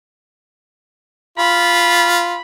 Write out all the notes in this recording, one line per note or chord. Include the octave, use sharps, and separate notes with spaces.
F4 B5